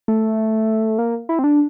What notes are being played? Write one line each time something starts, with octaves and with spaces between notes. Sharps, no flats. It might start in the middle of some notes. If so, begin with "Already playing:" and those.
A3
A#3
E4
C4
D4